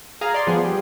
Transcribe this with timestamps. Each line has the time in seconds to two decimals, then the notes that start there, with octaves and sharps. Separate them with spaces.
0.21 G#4 F5 A#5
0.34 D5 C6
0.47 F3 B3 G#4
0.65 G3